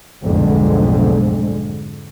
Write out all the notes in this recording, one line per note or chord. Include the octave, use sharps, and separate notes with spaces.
B1 F2 G#2 D3 G#3 A3